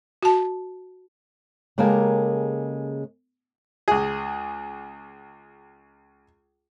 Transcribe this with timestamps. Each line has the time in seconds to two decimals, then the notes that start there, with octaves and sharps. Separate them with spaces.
0.22 F#4 A5
1.78 C#3 G#3 A#3 G4 A4 A#4
3.88 C#2 G#4